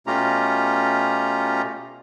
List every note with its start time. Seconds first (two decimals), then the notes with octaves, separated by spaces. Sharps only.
0.07 B2 A3 C#4 F4 G4 A#5